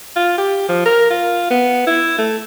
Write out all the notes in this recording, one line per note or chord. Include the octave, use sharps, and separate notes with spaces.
F4
G4
F3
A#4
F4
B3
E4
A3